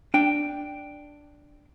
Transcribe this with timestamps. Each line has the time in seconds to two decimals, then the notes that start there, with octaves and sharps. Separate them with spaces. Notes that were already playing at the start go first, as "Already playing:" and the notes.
0.14 D4 G5